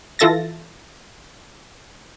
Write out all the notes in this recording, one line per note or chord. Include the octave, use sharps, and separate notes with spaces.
E3 F4 A4 E5 A6 A#6